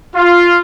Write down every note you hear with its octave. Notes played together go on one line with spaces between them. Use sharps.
F4